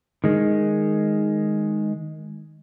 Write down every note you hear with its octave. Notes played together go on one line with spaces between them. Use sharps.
D#3 G#3